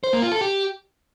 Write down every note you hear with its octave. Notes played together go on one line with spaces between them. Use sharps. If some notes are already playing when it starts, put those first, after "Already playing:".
C5
A#3
F4
A4
G4